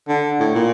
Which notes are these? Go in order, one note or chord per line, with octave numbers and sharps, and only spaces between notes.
D3
A2
A#2